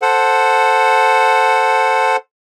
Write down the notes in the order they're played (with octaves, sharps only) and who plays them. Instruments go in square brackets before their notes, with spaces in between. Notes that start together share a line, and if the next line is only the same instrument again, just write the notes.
[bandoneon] A4 C5 F#5